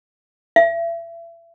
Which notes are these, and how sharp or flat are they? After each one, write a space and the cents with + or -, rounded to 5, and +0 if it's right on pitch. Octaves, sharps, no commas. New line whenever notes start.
E5 +30